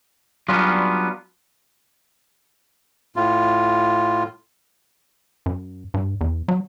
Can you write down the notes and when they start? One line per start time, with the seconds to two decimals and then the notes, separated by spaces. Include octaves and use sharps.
0.48 F#3 G3 B3 C#4 D4 F4
3.16 A2 F4
5.46 F#2
5.94 G2
6.21 E2
6.48 F#3